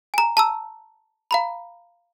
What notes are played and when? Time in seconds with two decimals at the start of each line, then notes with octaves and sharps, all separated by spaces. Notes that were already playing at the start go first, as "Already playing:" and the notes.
0.14 G#5 A#5
0.37 A5 A#5 E6
1.31 F5 A#5 B5